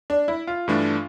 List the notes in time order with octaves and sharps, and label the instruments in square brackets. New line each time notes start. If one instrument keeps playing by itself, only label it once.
[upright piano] D4
E4
F4
[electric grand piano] G2 E3 A3 D4